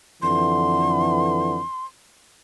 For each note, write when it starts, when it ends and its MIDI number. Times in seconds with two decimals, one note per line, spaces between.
0.22 1.60 41
0.22 1.60 50
0.22 1.60 52
0.22 1.85 84